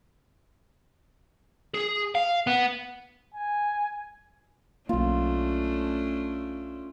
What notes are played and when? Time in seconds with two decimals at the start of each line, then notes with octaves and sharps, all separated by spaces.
1.74 G#4
2.15 F5
2.47 B3
3.34 G#5
4.89 B1 A3 A#3 C#4 D4 F4